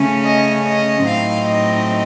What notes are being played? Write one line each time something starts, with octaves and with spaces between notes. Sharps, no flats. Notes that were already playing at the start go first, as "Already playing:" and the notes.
Already playing: C#3 A3 C#4
D#5
D#5
A2 F#3 C4 D#4 F5
D#5